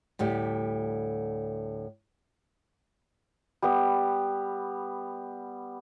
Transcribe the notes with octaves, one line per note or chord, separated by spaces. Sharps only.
D2 A2 G3 G4
G3 B3